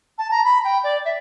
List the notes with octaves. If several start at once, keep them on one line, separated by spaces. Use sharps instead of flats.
A5
A#5
B5
G5
D5
E5